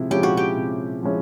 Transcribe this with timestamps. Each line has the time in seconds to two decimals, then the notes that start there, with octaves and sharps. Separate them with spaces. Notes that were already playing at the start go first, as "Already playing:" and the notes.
Already playing: C3 F3 G#3 E4
0.10 F3 G#3 C#4 E4 G4
0.23 F#4
0.37 G4
0.56 C3
1.03 F3 G#3 C#4 E4